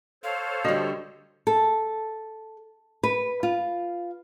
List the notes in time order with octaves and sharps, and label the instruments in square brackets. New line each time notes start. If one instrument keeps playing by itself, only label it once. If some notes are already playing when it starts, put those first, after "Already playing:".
[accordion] A4 C5 C#5 [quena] F5
[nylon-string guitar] D3 G3 [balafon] F#4 D#5
[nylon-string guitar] A4
B4
F4